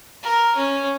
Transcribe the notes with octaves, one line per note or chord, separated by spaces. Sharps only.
A#4
C#4